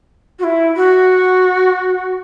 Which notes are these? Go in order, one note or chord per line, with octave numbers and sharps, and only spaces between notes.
F#4
E4
F#4